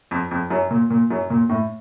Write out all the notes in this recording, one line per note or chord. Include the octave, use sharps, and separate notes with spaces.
F2
F2
F#2
A#2
A#2
F#2
A#2
A2